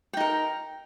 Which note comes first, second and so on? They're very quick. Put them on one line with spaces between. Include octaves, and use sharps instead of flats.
G5 D#4 A#4